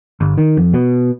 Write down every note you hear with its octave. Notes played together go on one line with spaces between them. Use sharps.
G1
D#3
F2
B2